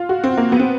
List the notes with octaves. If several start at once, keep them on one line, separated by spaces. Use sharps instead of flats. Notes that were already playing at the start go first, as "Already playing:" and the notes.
Already playing: F4
F#4
C4
A#3
B3
C4